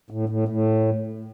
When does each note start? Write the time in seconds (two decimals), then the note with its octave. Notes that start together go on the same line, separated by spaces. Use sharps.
0.10 A2
0.29 A2
0.48 A2